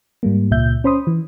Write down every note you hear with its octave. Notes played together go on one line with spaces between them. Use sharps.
G#2 G3 A#3
C#2 A#2 E5 G6
C#4 C5 B5 C6 D#6
E3